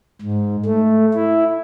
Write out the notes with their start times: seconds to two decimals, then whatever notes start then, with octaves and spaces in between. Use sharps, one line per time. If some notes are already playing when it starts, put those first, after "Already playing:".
0.21 G#2
0.65 A3
1.14 E4